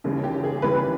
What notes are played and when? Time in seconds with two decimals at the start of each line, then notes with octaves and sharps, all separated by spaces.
0.04 D#2 C#3 E3 G3
0.24 G4
0.43 G#4
0.62 D#2 C#3 E3 G3 B4